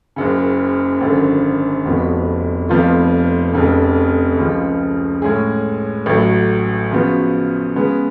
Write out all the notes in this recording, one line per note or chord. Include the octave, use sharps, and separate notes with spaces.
F#1 F#2 C#3
G#1 F#2 D3
F1 F2 F3 B3 F#4
F1 F2 F3 B3 F4
F1 F2 C#3
C#2 C#3 F3
A2 G#3 C#4 G#4
A1 A2 F#3
C#3 F3 B3 F#4
C#3 G#3 B3